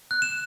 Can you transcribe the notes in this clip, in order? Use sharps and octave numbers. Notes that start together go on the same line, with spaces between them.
F#6
E7